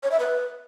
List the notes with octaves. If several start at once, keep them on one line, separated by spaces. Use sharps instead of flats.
C#5
E5
B4